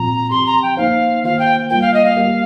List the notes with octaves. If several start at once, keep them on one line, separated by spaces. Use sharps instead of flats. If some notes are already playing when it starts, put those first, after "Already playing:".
Already playing: A#2 F3 C4 F4 A#5
F3 C4 G4 C6
A#5
G5
A#3 D#4 C5 F5
D#3 A#3 F4 C5 F5
G5
G3 A#3 F4 A#4 G5
F5
D#5
F5
G3 A#3 G4 A#4